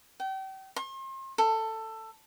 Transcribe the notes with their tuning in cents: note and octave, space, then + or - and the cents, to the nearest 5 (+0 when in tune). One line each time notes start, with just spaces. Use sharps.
G5 -35
C6 +40
A4 +15